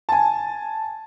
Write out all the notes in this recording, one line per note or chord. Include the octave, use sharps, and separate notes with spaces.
G#5 A5